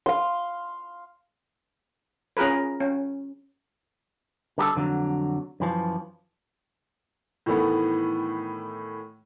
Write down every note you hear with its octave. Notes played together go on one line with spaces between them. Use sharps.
F5 C6
C#4 F4 G#4 A#4 B4
C#4
D3 G3 G4 A4
F2 D3 E3 F#3
F#2 E3 F3
A2 D#3 E3 A3 B3